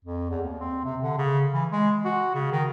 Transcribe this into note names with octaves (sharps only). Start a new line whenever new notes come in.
F2
E2
D#2
C4
C3
D3
C#3
E3
G#3
F#4
C#3
D#3